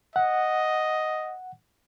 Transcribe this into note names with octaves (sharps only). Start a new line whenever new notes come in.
D#5 F#5